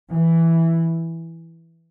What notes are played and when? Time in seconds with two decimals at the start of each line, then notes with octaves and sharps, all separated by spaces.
0.11 E3